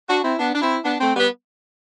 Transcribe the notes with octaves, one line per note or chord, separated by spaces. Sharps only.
D4 F#4
C4 E4
B3 D4
D4
C4 E4
B3 D4
A3 C4
G3 B3